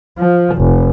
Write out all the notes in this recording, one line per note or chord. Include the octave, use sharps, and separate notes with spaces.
F3
F1